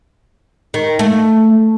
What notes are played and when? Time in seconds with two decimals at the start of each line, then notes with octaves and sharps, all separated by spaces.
0.74 D#3
0.99 A3